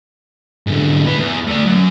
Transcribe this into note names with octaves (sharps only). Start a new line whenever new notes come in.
G#2 D3
B3 E4
E2
A3 D4
F#2 F#3